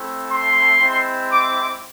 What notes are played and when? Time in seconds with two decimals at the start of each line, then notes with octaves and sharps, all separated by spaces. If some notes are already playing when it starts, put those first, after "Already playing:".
Already playing: A3 C4 E4
0.31 C6
0.80 G#3 C4 E4
1.31 D6